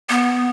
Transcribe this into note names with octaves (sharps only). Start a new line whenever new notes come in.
B3